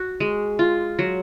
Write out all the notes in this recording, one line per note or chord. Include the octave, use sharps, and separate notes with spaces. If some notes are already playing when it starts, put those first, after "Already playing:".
Already playing: F#4
G#3
F4
F#3